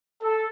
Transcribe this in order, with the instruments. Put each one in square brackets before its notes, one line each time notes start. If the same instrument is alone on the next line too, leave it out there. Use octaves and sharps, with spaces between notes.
[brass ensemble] A4